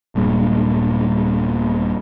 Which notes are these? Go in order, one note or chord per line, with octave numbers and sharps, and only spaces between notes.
D#1 G2 A#2 G#3